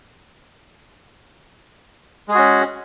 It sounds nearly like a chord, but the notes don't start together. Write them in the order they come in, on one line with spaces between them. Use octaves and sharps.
G#3 G#4 F#4 C#4